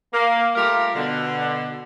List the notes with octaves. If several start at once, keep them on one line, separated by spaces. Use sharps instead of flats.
A#3
G3 A3 F4 G4 A#4
B2 D3